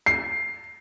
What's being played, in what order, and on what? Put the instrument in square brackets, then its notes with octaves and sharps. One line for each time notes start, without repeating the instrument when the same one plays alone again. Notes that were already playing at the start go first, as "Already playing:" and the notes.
[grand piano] C7